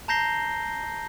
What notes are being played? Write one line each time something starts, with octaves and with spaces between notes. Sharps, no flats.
A5 A#5 G6 A#6 C7 G7